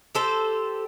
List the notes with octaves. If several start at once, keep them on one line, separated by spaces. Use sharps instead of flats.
G4 A4 C5